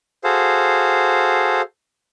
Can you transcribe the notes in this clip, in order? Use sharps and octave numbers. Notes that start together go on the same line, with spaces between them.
F#4 G#4 A4 C5 F5